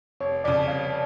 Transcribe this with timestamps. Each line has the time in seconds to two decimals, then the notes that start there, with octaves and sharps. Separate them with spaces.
0.20 F1 C#5
0.44 F2 C#3 D5
0.68 F1 F5